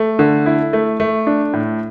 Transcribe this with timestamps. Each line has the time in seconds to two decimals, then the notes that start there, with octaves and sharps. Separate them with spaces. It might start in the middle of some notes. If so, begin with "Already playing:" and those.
Already playing: A3
0.19 D3
0.46 E4
0.73 A3
1.00 A3
1.27 D4
1.53 A2